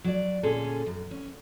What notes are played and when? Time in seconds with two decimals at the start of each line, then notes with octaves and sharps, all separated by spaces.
0.04 F#3 D5
0.43 D2 A#2 C#4 G#4 A4
0.86 F#2
1.11 C#4